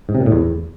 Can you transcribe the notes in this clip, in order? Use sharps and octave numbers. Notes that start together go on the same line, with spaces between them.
G#2
C3
A#2
A2
E2